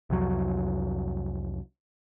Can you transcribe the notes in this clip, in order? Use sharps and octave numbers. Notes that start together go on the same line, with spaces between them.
C2 F2 F#3